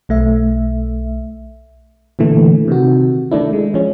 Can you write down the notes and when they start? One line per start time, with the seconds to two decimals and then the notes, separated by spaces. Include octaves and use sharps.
0.09 B1 A3 E5
2.19 A#2 D3 E3 A3
2.68 C3 D#3 F#4
3.31 D#3 A3 D4 E4
3.53 G#3
3.74 F3 C#4